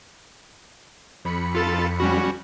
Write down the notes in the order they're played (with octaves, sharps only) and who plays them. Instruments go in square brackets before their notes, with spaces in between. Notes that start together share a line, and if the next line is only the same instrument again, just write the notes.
[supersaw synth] F2 B5 C#7
[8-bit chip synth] F4 A4 A6
G3 C#4 F#4